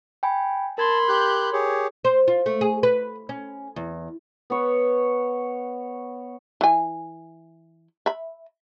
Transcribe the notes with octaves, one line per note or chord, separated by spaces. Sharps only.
G5 G#5 B5
A#4 A5 B5 C6 G#6
G4 F#6 G6
G4 G#4 C#5
C5
F4
A3
G#4
B4
C#4
E2
B3 C#5
E3 G#5
E5 B5